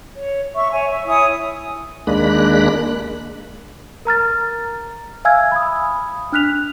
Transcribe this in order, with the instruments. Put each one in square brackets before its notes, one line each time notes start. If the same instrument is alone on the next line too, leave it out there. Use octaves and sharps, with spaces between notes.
[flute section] C#5
E5 C#6
C#5 G#5
E5
E4 C#5 G#5 D#6
[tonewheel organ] D#2 G#3 A#3 D4 B5 F#6
[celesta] A#4 A#5 F6 A6
E5 F5 G#5 E6 F6 G#6
B5 D#6
D4 F6 F#6 B6 F7